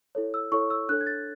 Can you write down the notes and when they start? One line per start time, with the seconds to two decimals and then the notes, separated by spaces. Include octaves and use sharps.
0.15 E4 A4 C#5
0.34 E6
0.52 E4 A4 C#5 C#6
0.70 E6
0.89 D4 A4 C#5 F#6
1.01 G#6
1.07 A6